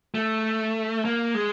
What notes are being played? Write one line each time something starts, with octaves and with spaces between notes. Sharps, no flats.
A3
A#3
G#3